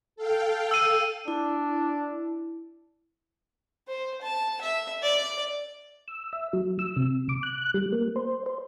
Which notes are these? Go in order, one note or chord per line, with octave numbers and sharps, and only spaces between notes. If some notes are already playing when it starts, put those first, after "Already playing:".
A4 F5 G5
E6 D#7
D4 E4
C5
A5
E5
D5
E6
E5
F#3
E6
C3
D6
F#6
G3
A#3
C5
C5